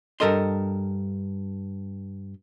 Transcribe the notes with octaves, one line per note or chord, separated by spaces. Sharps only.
G2 E3 A4 A#4 D#5 C6